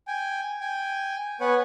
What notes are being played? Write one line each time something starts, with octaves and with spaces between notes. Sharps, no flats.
G5 G#5
G5 G#5
B3 B4 C#5 F#5 G#5